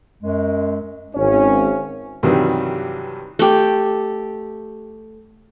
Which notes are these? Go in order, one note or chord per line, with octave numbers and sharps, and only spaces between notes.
F#2 G#3
G#1 C#4 C#5
G2 C3 D#3 E3 F#3 G3
A3 G4